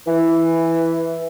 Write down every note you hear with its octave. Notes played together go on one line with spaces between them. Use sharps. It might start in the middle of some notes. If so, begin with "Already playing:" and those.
E3